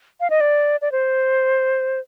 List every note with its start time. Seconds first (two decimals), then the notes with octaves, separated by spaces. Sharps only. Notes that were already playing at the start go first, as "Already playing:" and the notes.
0.20 F5
0.30 D#5
0.41 D5
0.82 D5
0.92 C5